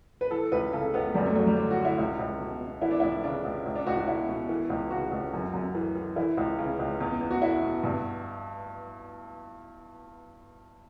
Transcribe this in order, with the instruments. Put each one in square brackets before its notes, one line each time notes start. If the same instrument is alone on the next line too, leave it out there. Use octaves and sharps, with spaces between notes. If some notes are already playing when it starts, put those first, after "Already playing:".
[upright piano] B4
E3 A4
C#2 B4
C#3 A4
C#2 B3
F#2 G3
A3
F#2 F#3
G3
D3 D4
F#4
D3
E4
C#2 E4
C#2
B2
B2
E3 E4
D4
C#2 E4
C#3 D4
C#2
C#2
D4
C#2 F#4
F#4
B2 E4
B2
E3
C#2
C#3 F#4
C#2
F#2
F#2
E3
E3
E3 E4
C#2
C#3
C#2
E2
E2
F#4
B2 E4
B2
G2